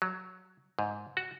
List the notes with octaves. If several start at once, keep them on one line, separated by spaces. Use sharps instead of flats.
F#3
G#2
F#4